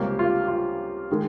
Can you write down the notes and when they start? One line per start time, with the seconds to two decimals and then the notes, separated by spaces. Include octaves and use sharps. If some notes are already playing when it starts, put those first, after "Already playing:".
Already playing: C#2 C3 G3 A#3 G4
0.19 F4
0.48 F4
1.11 D#3 G#3